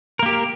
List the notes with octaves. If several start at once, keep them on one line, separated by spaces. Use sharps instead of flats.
A#3 G4 A#4